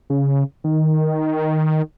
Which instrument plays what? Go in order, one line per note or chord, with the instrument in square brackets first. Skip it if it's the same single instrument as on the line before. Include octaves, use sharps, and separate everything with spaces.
[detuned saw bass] C#3
D#3